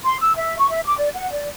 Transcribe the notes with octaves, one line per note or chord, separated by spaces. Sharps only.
C6
E6
E5
C#6
E5
D6
D5
F#5
D5